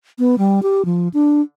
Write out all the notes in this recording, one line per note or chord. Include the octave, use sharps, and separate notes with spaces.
B3
G3
G4
F3
D4